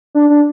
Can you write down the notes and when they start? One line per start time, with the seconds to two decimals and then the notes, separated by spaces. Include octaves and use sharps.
0.15 D4
0.30 D4